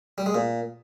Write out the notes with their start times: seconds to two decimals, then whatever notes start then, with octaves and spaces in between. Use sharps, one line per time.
0.18 G3
0.26 G#3
0.35 A#2